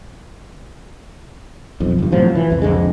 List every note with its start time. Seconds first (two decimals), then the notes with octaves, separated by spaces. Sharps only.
1.80 B1 F2
1.99 G1 G2
2.12 A2 C3 F3 F#3
2.35 E3
2.50 C2 F2
2.62 C2 F2 D3 G#3